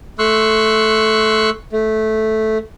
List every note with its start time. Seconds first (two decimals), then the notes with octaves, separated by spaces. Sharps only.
0.19 A3 C6 C#6 E6 F#6
1.73 A3